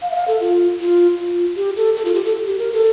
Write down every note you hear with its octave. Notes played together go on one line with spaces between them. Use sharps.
F5
E5
F5
A4
F4
F4
F4
G4
A4
A4
F4
G4
A4
G4
A#4
A4